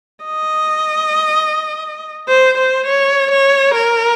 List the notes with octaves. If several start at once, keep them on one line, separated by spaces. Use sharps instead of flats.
D#5
C5
C5
C#5
C#5
A#4